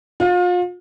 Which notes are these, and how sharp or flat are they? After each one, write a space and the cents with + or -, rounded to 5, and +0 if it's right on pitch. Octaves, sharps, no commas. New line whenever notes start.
F4 +35